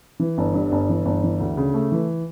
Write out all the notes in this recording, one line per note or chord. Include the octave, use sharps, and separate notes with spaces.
E3
G1
G2
G1
E3
G1
E3
D2
C#3
A3
E3